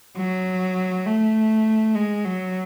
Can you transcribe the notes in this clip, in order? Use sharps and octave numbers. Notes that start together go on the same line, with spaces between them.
F#3
A3
G#3
F#3